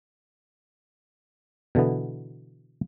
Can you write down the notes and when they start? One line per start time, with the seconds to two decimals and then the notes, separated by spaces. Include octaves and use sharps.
1.75 B2 D3 E3 B3